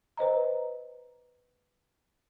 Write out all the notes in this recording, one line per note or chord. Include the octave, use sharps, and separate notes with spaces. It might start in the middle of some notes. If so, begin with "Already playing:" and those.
B4 C5 D#5 A#5